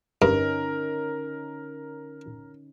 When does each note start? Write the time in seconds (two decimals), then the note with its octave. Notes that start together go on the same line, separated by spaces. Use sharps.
0.22 G2 D3 C#4 D#4 A#4